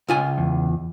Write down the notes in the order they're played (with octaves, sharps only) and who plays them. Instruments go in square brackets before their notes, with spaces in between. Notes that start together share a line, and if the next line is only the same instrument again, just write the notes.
[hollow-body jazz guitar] C#2 F4 G#5
[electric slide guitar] E2